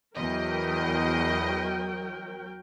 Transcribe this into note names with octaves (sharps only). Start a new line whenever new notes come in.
E2 F#3 A#4 D#5 G5